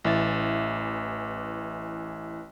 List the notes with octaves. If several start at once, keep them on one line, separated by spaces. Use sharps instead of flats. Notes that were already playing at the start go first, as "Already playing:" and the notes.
A1 E3 E5 A6